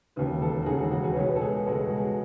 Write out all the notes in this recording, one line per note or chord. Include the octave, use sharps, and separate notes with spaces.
E1 D#2 C#3 B4
A4
F#4
E1 D#2 C#3 G#4
G#4
F#4
G#4
B4
C#2 B2 G#3 B3 C#5
B4
A4
G#4
F#4
C#2 B2 G#3 B3 A4
G#4
F#4
G#4